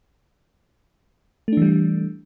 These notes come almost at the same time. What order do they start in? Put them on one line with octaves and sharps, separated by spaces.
A3 D4 E3 G3